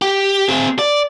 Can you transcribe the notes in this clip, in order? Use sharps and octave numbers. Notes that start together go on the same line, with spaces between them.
G4
C4 G#4
D5